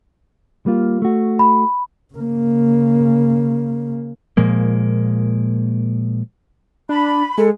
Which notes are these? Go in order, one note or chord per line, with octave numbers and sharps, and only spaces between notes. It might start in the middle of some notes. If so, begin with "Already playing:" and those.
G3 A#3 F4
A3 F#4
B5
C#3 A#3
A#2 F3 G#3 A#3
D4 B5
G#3 A4